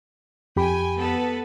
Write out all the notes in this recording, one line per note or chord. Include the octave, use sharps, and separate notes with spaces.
F2 G4 G5 G#5 B5
B3 A4 B4